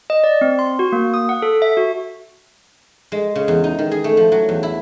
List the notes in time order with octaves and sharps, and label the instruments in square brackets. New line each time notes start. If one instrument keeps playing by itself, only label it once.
[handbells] D#5
D5
C4
C6
F#4
A#3
D#6
F#5
A4
E5
F#4
[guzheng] G#3
C#3
E2
D#4
D#3
G#4
A3
F3
F#3
E2
E4